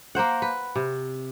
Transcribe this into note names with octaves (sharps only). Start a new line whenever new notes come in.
A#3 A#4 C5 F#5
B4
C3